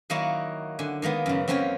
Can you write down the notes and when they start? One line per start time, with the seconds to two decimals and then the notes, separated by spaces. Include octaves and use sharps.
0.10 D#3 F#3 A#3 D#4 E4 F#4
0.79 D3 G#5
1.02 D#3 G#3 A#3 B3
1.26 F#2 C#3
1.48 F#2 A#3 C4 C#4 C#5 G5